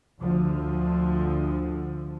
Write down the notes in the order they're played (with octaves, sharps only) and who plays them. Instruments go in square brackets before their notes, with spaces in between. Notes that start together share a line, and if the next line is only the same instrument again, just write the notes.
[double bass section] D2 D3 F3